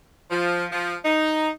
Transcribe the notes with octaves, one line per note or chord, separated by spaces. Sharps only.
F3
F3
D#4